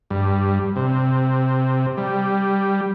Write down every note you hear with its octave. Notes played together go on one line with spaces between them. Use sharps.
G2
C3
G3